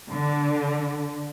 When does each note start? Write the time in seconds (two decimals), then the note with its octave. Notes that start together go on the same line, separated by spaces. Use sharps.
0.11 D3